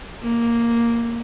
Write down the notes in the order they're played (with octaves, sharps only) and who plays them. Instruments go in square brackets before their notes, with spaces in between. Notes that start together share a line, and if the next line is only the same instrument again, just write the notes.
[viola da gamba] A#3